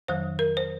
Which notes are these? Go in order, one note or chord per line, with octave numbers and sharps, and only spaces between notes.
F2 D#3 F#3 C5
A#4
C5